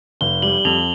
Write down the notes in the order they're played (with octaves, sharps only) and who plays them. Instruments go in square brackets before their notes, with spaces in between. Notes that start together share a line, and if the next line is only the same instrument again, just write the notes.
[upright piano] F1 [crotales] G7
[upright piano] G3 [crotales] F#7
[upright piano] F2 [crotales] F7